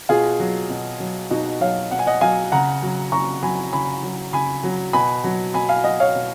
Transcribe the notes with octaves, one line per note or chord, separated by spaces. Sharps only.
B2 F4 G#4
F#3
B2
F#3
B2 D#4 F#4
F#3 C#5 F5
B2 F#5
G#5
D#5 F#5
F#3 F5 G#5
C#3 F#5 A#5
F#3
C#3 A#5 C#6
F#3 G#5 B5
C#3 G#5 B5
F#3
C#3 G#5 B5
F#3
B2 G#5 B5
F#3
B2 G#5 B5
F5 G#5
F#3 D#5 F#5
C#5 F5
B2